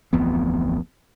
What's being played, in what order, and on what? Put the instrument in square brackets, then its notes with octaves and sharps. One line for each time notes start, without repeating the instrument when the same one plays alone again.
[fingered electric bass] D1 A1 F2 B3